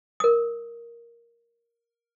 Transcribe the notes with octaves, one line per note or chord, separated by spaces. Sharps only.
A#4 D#6